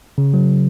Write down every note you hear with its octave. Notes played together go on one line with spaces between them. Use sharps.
C#3
F#3